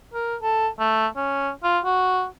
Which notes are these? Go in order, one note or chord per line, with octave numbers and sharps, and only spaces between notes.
A#4
A4
A3
C#4
F4
F#4